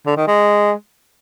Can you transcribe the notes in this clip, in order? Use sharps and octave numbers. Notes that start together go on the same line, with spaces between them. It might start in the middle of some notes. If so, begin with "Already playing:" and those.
D3
D#3
G#3